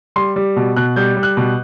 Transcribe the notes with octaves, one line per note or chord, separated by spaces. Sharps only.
G3 C6
G3
B2
B2 F#6
G3 G6
G3
F#6
B2